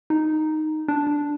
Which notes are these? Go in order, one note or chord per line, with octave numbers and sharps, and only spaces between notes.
D#4
D4
D4